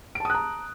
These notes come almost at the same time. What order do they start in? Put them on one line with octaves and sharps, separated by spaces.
D7 A5 D#6 F#6 A#5